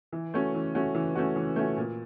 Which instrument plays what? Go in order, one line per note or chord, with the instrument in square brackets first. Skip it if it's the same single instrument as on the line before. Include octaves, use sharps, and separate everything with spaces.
[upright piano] E3
A3 C#4 F#4
E3
A3 C#4 F#4
E3
A3 C#4 F#4
E3
A3 C#4 F#4
A#2